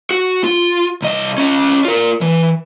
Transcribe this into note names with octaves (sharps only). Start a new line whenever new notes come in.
F#4
F4
C2 D#5
C#4 D#5
F4 A#4
E3